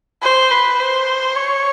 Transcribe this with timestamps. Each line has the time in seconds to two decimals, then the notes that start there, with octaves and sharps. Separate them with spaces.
0.23 C5
0.51 B4
0.80 C5
1.36 C#5